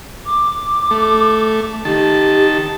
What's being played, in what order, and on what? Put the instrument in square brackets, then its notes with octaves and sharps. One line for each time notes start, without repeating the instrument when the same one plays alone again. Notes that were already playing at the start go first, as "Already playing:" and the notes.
[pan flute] D6
[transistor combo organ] A3
[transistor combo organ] D#3 A5 [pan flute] G4